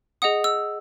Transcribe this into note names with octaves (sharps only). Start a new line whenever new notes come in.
G#4 D#5 F#5 D#6
E6